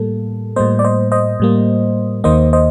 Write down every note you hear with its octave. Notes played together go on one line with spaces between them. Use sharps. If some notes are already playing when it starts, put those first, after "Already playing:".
Already playing: A2 G3 A#3 A4
A2 G3 A#3 C5 D#5
D5
C5 D#5
C5 D#5
A2 G3 A#3
D#2 D#3 A#3 C5 D#5
C5 D#5